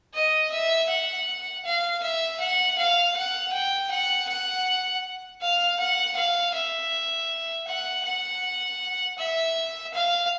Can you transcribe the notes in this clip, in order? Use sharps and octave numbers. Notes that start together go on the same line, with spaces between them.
D#5
E5
F#5
F5
E5
F#5
F5
F#5
G5
F#5
F#5
F5
F#5
F5
E5
F#5
F#5
E5
F5